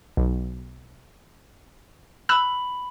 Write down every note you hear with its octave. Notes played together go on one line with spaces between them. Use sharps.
B1
B5 E6 F#6 F#7